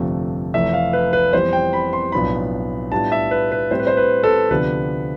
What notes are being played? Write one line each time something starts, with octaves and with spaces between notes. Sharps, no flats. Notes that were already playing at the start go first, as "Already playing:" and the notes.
Already playing: G1 F2 C3 F3 A3
F1 F2 E3 A3 E5
F5
B4
B4
F2 E3 G3 B3 C5
G5
B5
C6
B1 A2 F3 B3 D4 B5
A2 G3 B3 D4 F4 A5
E5
B4
B4
A2 G3 C4 E4 C5
B4
C5
B4
A4
D2 C3 F3 B3 D4 B4